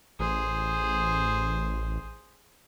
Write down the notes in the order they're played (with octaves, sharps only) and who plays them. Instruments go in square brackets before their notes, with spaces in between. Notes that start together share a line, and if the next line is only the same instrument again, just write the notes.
[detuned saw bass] A1 [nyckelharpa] G#4 C5